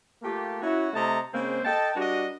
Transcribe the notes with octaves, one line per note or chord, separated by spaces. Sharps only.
A3 A#3 F4 G4
C#4 E4 F#4
C3 A3 D#5 A5 A#5
C#3 G#3 A#3 C4 C5
A4 D#5 G5 A5
G3 D4 F#4 A#4 D#5